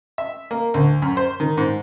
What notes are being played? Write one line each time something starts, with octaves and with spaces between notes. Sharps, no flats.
E5
A#3
D2
F#2
C5
D#3
G#2